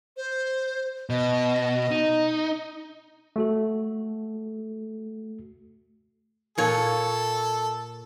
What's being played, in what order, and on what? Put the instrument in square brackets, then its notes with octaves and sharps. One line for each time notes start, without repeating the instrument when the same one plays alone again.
[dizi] C5
[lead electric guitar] B2 [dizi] D#5
[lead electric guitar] D#4
[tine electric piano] A3 F#4 A4
[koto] A#2 C#5 [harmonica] A4